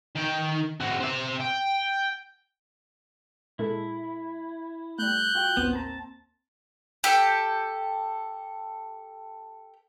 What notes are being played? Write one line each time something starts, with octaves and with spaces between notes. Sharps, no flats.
D#3 G5
C4 F#4
C4 E5
G5
A#2 G#3 E4 A4
G3 A3 F#6 G6
F4 F#4 G5
A1 D#2 B3 C4
A#3 A5 A#5
G4 A4 G5